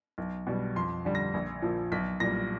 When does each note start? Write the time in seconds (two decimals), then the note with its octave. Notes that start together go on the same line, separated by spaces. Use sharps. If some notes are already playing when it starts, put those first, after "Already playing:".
0.18 B1
0.47 B2 G3
0.76 F2 C6
1.05 D3 G3
1.15 A#6
1.34 A#1
1.62 A#2 F3
1.92 B1 B6
2.20 A#2 G3 A#6